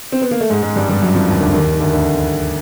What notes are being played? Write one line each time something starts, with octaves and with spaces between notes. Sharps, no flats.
C4
B3
A#3
A3
G#2 G#3
G#2 G#3
G2 G3
G2 G3
F#2 F#3
F2 F3
D#2 D#3
D2 D3
D#2 D#3
D#3
D2 D3
D2 D3